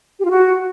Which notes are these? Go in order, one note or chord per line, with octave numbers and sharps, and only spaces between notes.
G4
F4
F#4